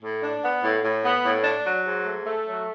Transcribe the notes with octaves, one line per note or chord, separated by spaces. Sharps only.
A2
D4
B3
A2
A2
B3
A2
D4
F#3
G#2
A3
A3
F#3